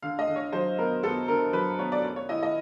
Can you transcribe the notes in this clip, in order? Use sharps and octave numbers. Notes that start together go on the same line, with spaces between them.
D3 F5
D#5
D3
C#5
F#3 C5
B3 A#4
B3 A4
D3 A#4
F#3 B4
B3 C#5
D5
C#4
C#5
E4 D#5
D#5